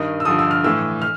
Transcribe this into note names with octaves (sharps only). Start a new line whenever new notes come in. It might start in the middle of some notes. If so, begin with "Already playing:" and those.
Already playing: G2 D#3 D#6
E6
G2 D3 F3 D#6
E6
F6
A2 E3 E6
F6